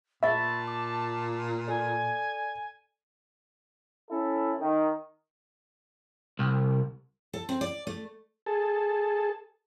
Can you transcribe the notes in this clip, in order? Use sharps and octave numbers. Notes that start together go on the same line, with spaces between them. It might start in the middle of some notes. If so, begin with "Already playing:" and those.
A#2 E5 A5 B5 C#6 A6
D6
A4 D5 G#5
C#4 E4 A4
D#3
C2
A4
C4
D5
A3
G#4 A4 A5